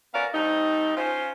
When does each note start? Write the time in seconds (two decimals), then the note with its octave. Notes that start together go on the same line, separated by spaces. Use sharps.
0.14 B3 C#4 F#4 A#4 D5 F5
0.34 G3 A3 C4 D#4
0.97 C#4 F4 C5